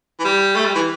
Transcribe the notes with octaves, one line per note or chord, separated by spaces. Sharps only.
E3
G3
A3
G3
E3